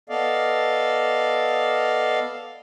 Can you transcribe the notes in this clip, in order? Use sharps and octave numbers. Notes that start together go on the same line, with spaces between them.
B3 A4 D5 D#5 F5